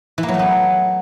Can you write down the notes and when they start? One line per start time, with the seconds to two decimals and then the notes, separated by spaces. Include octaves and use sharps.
0.18 E3
0.23 A#3
0.29 F#3
0.34 A3
0.39 B3